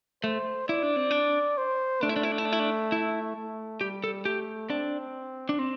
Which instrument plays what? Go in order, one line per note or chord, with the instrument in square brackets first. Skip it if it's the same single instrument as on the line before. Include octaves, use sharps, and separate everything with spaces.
[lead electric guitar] A3 [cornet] C5
[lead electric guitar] E4 [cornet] D5
[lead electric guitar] D4
C4
D4
[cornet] C5
[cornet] A3 [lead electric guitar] D4
[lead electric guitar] E4
D4
E4
D4
E4
D4
E4
D4
E4
[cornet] A3
[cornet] G3 [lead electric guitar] G4
[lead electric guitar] A4
[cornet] A3 [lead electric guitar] G4
[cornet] C4 [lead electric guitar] D4
[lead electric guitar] D4
C4